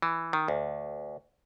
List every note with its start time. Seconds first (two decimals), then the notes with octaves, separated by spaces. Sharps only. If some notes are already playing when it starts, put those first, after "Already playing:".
0.02 E3
0.33 D#3
0.48 D2